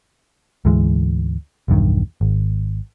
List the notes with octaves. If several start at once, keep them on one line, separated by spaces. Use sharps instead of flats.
D2 G#2 E3 G#3
B1 E2 G2 D#3
G#1